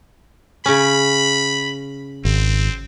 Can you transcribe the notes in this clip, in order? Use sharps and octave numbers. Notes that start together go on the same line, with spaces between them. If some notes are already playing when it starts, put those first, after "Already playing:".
C#3 C#4 B5
G#1 C4